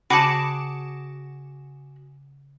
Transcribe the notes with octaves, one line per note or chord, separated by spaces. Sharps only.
C#3 F#4 G#4 A5 B5 D6 C#7 E7